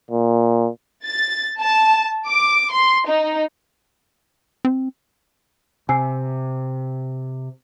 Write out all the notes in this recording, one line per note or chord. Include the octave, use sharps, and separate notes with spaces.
A#2
A6
A5
D6
C6
D#4
C4
C3 G#5 E6 C7